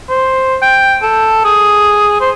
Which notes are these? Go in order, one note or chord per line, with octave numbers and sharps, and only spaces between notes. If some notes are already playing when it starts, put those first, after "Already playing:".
C5
G5
A4
G#4
C5